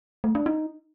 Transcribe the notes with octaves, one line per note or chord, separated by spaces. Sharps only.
A3
D4
D#4